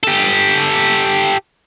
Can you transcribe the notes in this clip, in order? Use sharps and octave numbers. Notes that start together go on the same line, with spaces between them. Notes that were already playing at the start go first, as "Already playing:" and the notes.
G4 A4